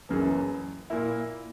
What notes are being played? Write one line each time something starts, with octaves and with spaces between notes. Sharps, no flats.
F#1 F#2 C#3 E3
A#2 A#3 E4